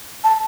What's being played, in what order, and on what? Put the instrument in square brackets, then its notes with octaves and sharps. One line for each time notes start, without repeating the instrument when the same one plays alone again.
[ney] A5